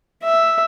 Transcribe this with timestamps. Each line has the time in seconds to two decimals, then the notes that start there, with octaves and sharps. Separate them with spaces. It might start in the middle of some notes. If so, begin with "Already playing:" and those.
0.24 E5